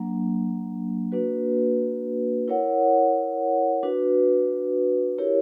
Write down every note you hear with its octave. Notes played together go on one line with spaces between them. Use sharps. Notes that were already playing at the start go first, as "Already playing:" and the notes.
Already playing: F#3 A#3 D4
A#3 D4 F#4 B4
E4 A#4 C#5 F#5
D4 F#4 B4
E4 G4 A#4 C#5